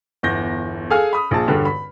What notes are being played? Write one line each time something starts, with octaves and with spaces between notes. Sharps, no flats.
G1 E2 G6 A#6
G#4 A4 F5 G#5 F6
B5 D#6
A#1 G#4 A5
E1 G2 D3 G4
B5